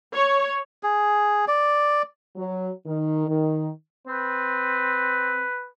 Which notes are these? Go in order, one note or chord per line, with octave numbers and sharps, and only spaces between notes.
C#5
G#4
D5
F#3
D#3
D#3
C4 B4